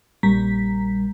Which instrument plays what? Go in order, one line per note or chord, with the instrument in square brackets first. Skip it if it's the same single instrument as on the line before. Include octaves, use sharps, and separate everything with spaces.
[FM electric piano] A#1 A#2 G3 A#5 B6